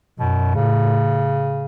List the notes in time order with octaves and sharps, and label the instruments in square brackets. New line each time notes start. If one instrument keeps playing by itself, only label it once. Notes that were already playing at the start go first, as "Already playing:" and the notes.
[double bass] F#2 [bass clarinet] B2
[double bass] A2 [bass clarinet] C#3